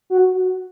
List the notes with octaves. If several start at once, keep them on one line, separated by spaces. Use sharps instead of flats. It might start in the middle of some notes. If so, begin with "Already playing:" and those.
F#4